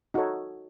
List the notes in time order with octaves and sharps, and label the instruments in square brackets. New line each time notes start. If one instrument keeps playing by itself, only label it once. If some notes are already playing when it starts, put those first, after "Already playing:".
[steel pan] D#4 F#4 A4 C#5